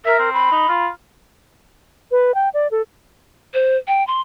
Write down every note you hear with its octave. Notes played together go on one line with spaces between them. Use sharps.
A#4 E5
C4
B5
D#4
F4
B4
G5
D5
A4
C5
G5
C6